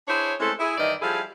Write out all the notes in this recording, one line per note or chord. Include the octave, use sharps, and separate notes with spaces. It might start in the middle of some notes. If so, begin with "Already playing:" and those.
D4 E4 G#4 C5 C#5
G#3 A3 C4 C#4 E4 A4
E4 G#4 E5
G2 D#3 E3 D5 D#5
F3 G3 E4 G#4 A4 F5